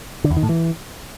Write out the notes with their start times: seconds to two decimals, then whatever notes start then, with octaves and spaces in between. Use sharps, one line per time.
0.24 D3
0.31 E2
0.37 D#3
0.43 A2
0.49 E3